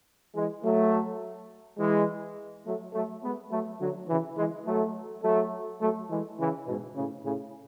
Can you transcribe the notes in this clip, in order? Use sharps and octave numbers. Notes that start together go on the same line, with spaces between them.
E3 G#3
F#3 A3
E3 G#3
F#3 A3
F#3 A3
G#3 B3
F#3 A3
D3 F#3
C#3 E3
E3 G#3
F#3 A3
F#3 A3
F#3 A3
E3 G#3
C#3 E3
G#2 B2
A2 C#3
A2 C#3